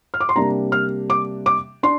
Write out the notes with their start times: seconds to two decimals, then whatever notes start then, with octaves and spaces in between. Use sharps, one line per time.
0.14 F6
0.20 D6
0.29 C6
0.36 C3 G3 A#3 D4 A#5
0.72 F6
1.10 D6
1.46 D6
1.83 D4 C6